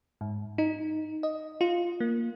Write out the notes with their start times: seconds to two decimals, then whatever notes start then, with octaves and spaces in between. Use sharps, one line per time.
0.21 G#2
0.58 D#4
1.23 D#5
1.61 F4
2.00 A#3